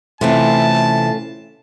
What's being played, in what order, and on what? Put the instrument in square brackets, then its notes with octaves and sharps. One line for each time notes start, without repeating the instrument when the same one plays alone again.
[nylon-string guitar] C3 E3 [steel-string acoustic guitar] A3 C#4 F4 [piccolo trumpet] A5